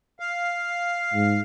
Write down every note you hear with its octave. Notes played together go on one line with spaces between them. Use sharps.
F5
G#2